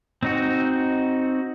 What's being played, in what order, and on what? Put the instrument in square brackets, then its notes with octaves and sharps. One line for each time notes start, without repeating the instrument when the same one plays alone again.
[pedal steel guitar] C4 D#4 F#4